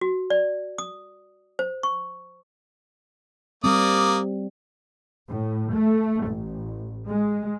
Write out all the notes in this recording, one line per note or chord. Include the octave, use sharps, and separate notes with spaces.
F#4
D5
D#6
C5
C#6
G3 A#3 C4 D5 D#6
A2
A3
A1
G#3